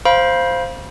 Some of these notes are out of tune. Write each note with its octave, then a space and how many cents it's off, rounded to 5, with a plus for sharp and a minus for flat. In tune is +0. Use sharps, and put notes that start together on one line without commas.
C5 +0 F5 +0 B5 -35